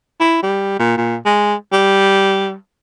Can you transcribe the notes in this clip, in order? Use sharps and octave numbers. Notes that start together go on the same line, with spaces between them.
E4
G3
A#2
A#2
G#3
G3